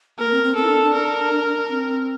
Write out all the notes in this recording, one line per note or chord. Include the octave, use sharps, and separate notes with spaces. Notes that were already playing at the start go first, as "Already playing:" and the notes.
A#3 A#4
C4
C4
C4 A4
E4
D4
D4
A#4
C4